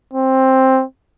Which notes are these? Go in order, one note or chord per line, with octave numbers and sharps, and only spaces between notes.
C4